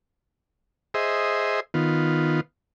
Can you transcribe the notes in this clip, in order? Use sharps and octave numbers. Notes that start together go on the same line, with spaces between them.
G#4 C5 D#5 E5
D#3 B3 F4